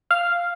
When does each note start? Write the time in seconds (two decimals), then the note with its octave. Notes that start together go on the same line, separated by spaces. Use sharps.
0.11 F5